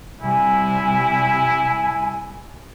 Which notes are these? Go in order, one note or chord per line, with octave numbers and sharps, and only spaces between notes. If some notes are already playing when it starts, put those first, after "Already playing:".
C3 G3 E4 G#5